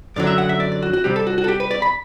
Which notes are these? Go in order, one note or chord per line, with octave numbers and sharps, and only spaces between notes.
F#2 D3 F#3 D5
E5
F#5
E5
D5
D5
F#4
F#4
C3 G3 C4 G4
A4
F#4
F#4
A4
G4
B4
D5
B5